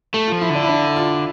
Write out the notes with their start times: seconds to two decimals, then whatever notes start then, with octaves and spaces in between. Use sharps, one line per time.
0.14 A3 A4
0.27 F3 F4
0.41 E4
0.50 D3
0.55 D4
0.63 E4
0.69 D4
0.96 F4